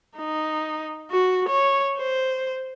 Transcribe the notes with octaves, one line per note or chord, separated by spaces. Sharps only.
D#4
F#4
C#5
C5